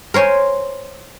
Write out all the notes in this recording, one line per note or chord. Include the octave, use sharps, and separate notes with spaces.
A#4 C5 C#5 G#5